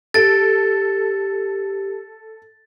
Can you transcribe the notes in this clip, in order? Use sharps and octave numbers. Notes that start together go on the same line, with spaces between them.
G4 A4 A6 D7